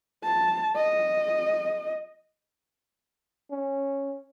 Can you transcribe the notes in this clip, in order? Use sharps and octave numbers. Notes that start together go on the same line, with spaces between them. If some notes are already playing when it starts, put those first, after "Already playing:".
A5
D#5
C#4